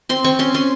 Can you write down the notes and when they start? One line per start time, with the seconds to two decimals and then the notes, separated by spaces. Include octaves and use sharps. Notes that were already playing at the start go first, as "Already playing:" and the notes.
0.09 C4 C6
0.24 C4 C#6
0.39 C#4 C6
0.54 C#4 C6